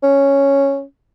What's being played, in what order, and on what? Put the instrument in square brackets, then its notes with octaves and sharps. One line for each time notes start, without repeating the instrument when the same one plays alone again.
[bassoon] C#4